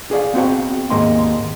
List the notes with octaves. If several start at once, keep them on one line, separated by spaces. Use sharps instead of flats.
G#4 D5 F5
B3 C4 F#4 C5
D#2 G#2 G#3 A#3 D#4 C6